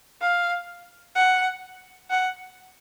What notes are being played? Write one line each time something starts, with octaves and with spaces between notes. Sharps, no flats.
F5
F#5
F#5